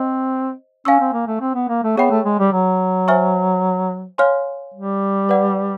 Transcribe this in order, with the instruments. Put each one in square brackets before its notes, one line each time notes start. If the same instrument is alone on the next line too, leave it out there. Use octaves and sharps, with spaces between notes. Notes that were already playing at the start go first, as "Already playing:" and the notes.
Already playing: [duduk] C4 [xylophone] C5 D#5
[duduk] C#4 [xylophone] F5 G#5 C#6 E6
[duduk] C4
A#3
A3
C4
B3
A#3
A3
[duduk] B3 [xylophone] G#4 C#5 E5 G5 B5
[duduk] A3
G#3
G3
F#3
[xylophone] C5 E5 G#5 C#6 F6
C#5 F5 G#5 C6 F6
[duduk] G3
[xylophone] B4 D5 F#5